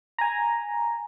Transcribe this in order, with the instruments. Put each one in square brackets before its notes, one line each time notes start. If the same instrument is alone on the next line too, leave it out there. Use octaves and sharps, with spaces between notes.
[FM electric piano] G#5 A#5